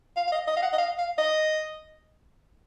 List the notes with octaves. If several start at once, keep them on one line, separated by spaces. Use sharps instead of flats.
F5
F5
D#5
D#5
F5
F#5
D#5
F5
F5
D#5